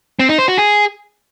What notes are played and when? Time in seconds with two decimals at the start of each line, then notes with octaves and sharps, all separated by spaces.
0.19 C4
0.29 D#4
0.39 C5
0.48 F#4
0.58 G#4